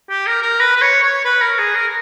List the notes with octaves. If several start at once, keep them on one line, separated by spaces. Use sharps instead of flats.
G4
A#4
A#4
B4
B4
C#5
C#5
B4
A#4
G#4
A#4